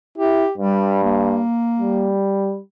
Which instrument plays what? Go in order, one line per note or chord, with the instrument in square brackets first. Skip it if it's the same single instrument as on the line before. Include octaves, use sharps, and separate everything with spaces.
[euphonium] E4 [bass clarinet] G4
[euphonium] G2 [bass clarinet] G3
[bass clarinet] A#3
[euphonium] G3